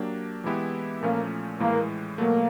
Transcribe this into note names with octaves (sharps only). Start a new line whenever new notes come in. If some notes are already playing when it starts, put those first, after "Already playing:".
Already playing: F#3 A#3 D4 G4
E3 G#3 B3 E4 G4
A#2 F3 A3 A#3 C#4
A2 E3 G#3 A#3
B2 F#3 A3 A#3